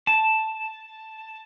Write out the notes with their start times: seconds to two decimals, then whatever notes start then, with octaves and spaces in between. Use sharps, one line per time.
0.07 A5